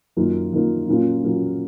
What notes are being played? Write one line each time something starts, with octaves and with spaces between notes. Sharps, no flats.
F#2 D#3 A#3 F4
F#2 D#3 A#3 F4
A#2 F#3 A#3 C#4 F4
A#2 F#3 A#3 C#4 F4